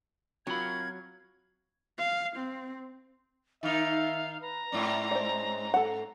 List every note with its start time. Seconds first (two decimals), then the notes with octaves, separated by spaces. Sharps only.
0.47 F#3 C4 F4 F#4 A#4 B5 G#6
1.98 F5
2.36 C4
3.63 D#3 D#4 E5 F5
4.42 B4 A#5
4.72 G#2 C4 C#4 D5
5.11 G#3 C5 D5
5.74 A4 F#5